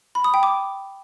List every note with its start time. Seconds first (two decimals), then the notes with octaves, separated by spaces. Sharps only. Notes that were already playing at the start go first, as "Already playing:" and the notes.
0.15 B5
0.24 D#6
0.34 G5
0.43 D6